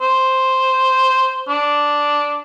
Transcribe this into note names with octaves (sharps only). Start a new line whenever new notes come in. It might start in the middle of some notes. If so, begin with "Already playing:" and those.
C5
D4